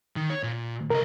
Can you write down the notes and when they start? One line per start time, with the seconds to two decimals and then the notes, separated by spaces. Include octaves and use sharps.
0.16 D#3
0.30 C#5
0.43 A#2
0.90 C2 A#4 D#5